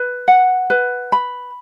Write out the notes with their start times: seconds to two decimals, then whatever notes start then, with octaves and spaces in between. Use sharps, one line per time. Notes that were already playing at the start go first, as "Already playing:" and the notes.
Already playing: B4
0.28 F#5
0.70 B4
1.12 B5